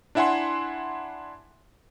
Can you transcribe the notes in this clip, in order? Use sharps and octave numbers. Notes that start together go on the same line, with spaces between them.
D4 E4 E5 F#5 G#5 C6